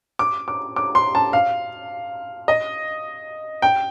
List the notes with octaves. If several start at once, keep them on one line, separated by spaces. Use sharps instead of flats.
D6
D6
D6
C6
A5
F5
D#5
G5